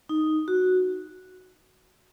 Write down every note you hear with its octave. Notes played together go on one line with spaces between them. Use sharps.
D#4
F#4